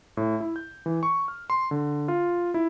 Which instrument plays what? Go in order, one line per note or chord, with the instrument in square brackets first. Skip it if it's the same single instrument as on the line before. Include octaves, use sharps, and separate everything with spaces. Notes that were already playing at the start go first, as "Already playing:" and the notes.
[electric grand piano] A2
E4
G6
E3
C#6
F6
C6
D3
F4
E4